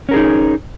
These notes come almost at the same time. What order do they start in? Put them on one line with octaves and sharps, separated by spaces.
C#4 A#4 G#4 D#4